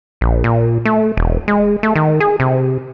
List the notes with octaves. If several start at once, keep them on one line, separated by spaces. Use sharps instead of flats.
A#1
A#2
A3
E1
G#3
A3
D#3
G#4
C3